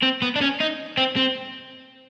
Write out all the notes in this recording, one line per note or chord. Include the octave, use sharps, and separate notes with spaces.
C4
B3
D4
C#4
D#4
C4
C4